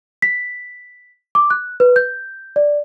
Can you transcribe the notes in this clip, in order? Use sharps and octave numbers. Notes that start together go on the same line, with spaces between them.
B6
D6
F#6
B4
G6
D5